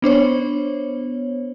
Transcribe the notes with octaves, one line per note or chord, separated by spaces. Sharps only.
B3 D4 C5 C#5